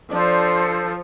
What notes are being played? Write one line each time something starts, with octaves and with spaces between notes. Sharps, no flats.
F3 D4 A4 C5 D5